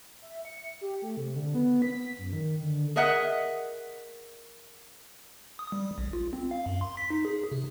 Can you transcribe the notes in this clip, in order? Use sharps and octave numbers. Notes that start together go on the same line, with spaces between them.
E5
C#7
G4
A3
C3
D3
B3
B6
F#2
D#3
D3
G#4 A#4 D#5 E5 F#5
D#6
G3
A#1
F4
C4
F5
F#2
C6
B6
D#4
G#4
C3